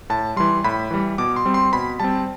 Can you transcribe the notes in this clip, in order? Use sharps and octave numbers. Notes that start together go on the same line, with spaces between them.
A2 A5
E3 G3 C6
A2 B5
E3 G3
B2 D6
C6
G3 C4
C6
B2 B5
G3 C4 A5